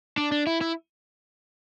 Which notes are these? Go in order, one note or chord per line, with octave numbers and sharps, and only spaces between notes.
D4
D4
E4
E4